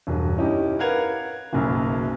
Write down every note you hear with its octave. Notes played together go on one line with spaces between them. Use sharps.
E1 G2
C#4 D#4 E4 G4
A#4 B4 F5 F#5 G#6 F7
F#1 B1 F#2